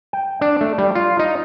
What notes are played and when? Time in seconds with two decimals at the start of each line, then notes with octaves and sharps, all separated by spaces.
0.13 G5
0.41 D4
0.61 A3
0.78 G3
0.95 F4
1.19 D#4